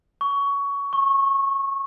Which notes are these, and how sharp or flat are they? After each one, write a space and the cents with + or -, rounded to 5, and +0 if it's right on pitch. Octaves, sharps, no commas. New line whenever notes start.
C#6 +20
C#6 -20